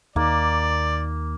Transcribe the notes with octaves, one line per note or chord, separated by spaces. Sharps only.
D#2 D#3 A#3 D5